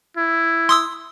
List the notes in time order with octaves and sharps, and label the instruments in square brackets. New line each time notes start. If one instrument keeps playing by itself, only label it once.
[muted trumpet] E4
[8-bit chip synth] C6 D#6 E6